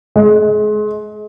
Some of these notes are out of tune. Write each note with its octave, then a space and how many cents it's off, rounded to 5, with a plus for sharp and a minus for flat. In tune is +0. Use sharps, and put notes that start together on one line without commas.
G#3 +35